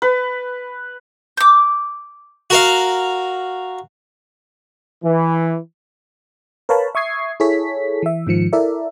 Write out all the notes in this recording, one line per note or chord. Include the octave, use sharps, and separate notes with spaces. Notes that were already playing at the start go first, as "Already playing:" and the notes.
B4
D6 G6
F#4 A#4 F5
E3
A#4 B4 C#5 F5 A5 B5
E5 C#6 D#6 G#6 C7
E4 G#4 A4 C#5 B6
E3 E5
G#2 D#3 F3 C#7
E4 A4 A#4 D5 E5